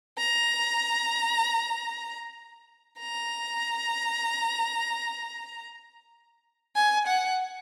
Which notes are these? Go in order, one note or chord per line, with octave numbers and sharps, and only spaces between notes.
A#5
A#5
G#5
F#5